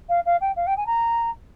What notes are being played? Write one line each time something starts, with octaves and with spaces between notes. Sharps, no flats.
F5
F5
G5
F5
G5
G#5
A#5